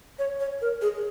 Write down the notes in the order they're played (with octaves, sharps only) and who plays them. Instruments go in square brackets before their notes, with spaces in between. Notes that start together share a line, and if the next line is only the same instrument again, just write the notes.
[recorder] C#5
C#5
A#4
G#4